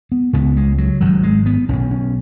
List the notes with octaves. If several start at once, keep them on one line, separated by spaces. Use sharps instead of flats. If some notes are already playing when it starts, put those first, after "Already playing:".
B3
C#2 C#3 B3
G#3
F#3
G#1 G#2 F#3
G#3
B3
B1 B2 C#4
C#4